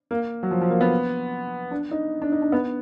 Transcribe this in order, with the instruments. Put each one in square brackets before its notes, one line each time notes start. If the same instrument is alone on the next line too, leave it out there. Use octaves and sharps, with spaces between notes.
[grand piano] A#3
F#3
F3
F3
A#3
B3
D4
D#4
D4
D#4
D4
B3